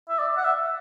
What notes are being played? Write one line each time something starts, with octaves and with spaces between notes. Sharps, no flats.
E5
D5
F#5
E5